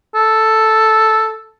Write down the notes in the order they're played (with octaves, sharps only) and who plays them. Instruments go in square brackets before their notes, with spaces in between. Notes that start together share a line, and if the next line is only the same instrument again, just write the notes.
[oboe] A4